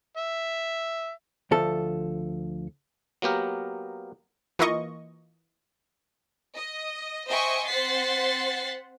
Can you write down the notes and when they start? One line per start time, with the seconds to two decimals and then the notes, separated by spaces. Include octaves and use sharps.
0.17 E5
1.51 D2 F3 A4
3.22 F#3 A#3 B3 G4 A#4
4.59 E3 A#3 F4 D#5 C#6
6.54 D#5
7.27 C5 D#5 E5 G5 G#5 C#6
7.67 C4 C5 F#5 A6 B6 C7